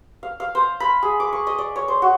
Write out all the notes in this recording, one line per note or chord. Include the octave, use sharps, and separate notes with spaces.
F5
F5
C5
B5
G#4
D6
C#6
D#5
D5
C#5
C5
F#4